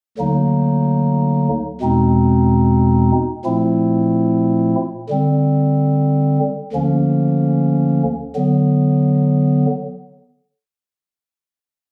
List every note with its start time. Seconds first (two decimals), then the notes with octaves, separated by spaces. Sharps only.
0.18 D2 D3 F#3 A#3 D#4
1.81 E2 B2 G#3 C4 D#4
3.45 A#2 F3 A3 C4 E4
5.09 D3 G3 C4
6.72 D2 D3 F3 A#3 C#4
8.35 D3 F#3 B3